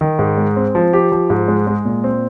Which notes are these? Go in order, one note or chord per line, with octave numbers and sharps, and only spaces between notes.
D#3
G#2
G#3
C4
F3
G4
F3
G#2
G#3
G#3
A#2
C4